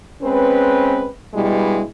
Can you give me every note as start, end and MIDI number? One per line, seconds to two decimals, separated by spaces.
0.22 1.07 56
0.22 1.07 60
0.22 1.07 61
0.22 1.07 71
1.34 1.83 43
1.34 1.83 47
1.34 1.83 55
1.34 1.83 56
1.34 1.83 64